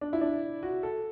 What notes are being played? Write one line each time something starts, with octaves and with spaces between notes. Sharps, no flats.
D4
E4
D4
F#4
A4